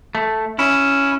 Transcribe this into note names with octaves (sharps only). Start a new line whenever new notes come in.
A3
C#4 E4